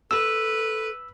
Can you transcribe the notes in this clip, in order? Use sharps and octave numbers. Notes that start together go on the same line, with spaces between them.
A4 B4 E6